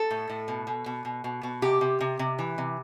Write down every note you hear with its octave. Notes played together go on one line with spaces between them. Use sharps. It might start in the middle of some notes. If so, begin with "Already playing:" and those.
Already playing: A4
A2
A2
B2
B2
B2
B2
B2
B2
C3 G4
C3
C3
C3
E3
C3